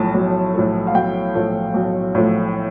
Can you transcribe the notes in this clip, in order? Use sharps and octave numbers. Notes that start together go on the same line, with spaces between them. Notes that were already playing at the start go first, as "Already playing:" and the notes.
Already playing: B1 A2 F3 A3 A5
B1
A2 F3 A3
F5
B1 G5
A2 F3 A3
B1
A2 F3 A3